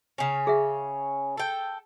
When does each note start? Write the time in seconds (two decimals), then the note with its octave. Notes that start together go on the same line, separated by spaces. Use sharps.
0.18 C#3 C#4
0.47 G#4 E5 F#5
1.37 A4 G5